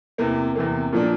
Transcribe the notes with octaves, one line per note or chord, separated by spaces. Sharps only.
E2 C3 E3 A#3
E2 C3 E3 A#3
A#2 F3 A#3 D4